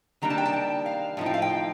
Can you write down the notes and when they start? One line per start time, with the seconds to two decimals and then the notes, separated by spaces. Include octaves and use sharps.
0.22 D#3 G3 A#3 D4 A#5
0.30 A5
0.38 G5
0.46 A5
0.53 G5
0.86 F5
1.17 A2 F3 D#4
1.26 G5
1.34 F5
1.42 G5